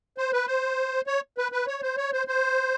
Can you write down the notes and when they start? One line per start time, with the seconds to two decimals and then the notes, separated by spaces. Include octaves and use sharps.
0.18 C5
0.32 B4
0.47 C5
1.07 C#5
1.38 B4
1.52 B4
1.67 C#5
1.82 C5
1.97 C#5
2.13 C5
2.28 C5